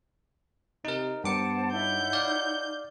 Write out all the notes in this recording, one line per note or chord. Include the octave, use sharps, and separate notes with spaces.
C3 D#4 A#4
G2 B3 C5 F#5 A5 D6 C#7
D#4 E4 C#5 F#5 G6
D5 F5